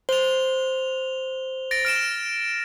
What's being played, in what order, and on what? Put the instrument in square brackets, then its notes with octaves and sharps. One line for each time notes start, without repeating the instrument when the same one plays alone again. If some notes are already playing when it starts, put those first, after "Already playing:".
[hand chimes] C5 [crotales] F7 G7
[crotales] A6 A#6 D7
F6 D7 E7